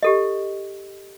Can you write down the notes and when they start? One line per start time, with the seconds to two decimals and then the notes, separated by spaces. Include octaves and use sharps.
0.03 G4 A4 D#5